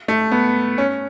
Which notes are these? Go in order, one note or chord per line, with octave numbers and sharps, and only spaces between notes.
A3
B3
C#4